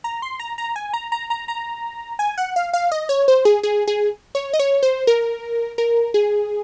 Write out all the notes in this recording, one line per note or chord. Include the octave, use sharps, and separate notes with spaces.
A#5
C6
A#5
A#5
G#5
A#5
A#5
A#5
A#5
G#5
F#5
F5
F5
D#5
C#5
C5
G#4
G#4
G#4
C#5
D#5
C#5
C5
A#4
A#4
G#4